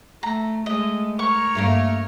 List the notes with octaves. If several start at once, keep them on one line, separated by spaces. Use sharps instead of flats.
A3 A#5
G#3 A3 D#5
A#4 C#5 C#6
G2 A3 A#3